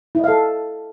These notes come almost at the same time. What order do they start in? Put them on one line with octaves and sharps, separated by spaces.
E4 D#5 F5 A4